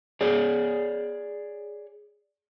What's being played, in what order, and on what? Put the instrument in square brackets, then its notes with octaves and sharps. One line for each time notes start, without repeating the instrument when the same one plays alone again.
[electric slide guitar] G#4 C#5 D5